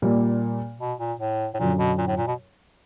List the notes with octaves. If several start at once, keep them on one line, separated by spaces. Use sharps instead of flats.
A#2 G3 A#3
B2
A#2
A2
A2
F#2 A#2 D3 F#3
B2
A#2
A2
A#2
B2